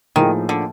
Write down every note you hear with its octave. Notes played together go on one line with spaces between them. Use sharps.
A2 D#3 F3 A#3 D#4 G#4
D3